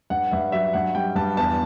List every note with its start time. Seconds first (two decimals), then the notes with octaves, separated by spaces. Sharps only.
0.10 G2 F#5
0.31 G2 E5
0.52 F#3 E5
0.73 G2 F#5
0.95 G3 G5
1.15 G2 A5
1.37 E2 A5